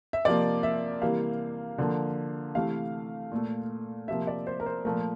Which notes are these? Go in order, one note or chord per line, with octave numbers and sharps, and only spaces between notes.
E5
C3 F3 A#3 D5
E5
C3 E3 G3 A#3 F5
D3 F3 A#3
C3 E3 A3 F5
A#2 A3
C3 F3 A#3 E5
D5
C5
A#4
C5
A#2 F3 A3 A#4